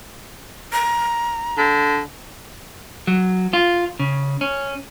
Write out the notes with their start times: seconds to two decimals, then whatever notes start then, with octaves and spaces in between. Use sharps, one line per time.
0.73 A#5
1.57 D3
3.07 F#3
3.53 F4
3.99 C#3
4.41 C#4